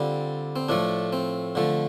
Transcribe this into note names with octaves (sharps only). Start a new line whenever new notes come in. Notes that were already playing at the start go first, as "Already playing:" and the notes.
Already playing: D3 G3 C4 F4
C4
A2 F3 A3 D4
C4
D3 F3 A3